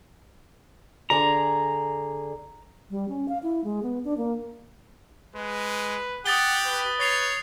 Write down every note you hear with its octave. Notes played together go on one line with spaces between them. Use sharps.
D3 G#4 D5 A#5
G3
C#4
F5
E4
G#3
B3
D4
A#3
G#3 B4
G4 F#5 D#6 A6 G7
B4
C#5 A6 C7 F7